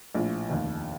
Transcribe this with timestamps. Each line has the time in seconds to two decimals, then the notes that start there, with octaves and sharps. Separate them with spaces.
0.15 A#1 A2 F3
0.49 F1 D#2 D#3